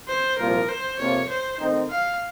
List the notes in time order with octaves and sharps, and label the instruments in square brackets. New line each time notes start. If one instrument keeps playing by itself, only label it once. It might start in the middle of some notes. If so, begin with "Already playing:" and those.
[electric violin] C5
[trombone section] C2 A#2 F3 [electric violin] A#4
[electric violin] C5
[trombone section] F2 C3 F3 A#3 F4 [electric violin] C#5
[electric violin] C5
[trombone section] D#3 A3 C4 D#4
[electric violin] F5